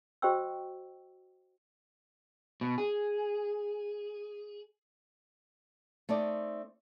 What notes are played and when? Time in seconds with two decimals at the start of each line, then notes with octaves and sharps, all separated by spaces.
0.22 F#4 C5 D#5 G5 C#6 E6
2.61 B2
2.78 G#4
6.09 A3 C4 D#4 D5